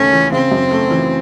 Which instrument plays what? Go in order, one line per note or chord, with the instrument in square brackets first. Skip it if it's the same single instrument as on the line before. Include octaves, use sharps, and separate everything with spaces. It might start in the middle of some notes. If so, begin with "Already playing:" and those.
Already playing: [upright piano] D#2 C#3 A3 [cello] C#4
[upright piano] E3
[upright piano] C#3 [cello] C4
[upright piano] F#2
A3
E3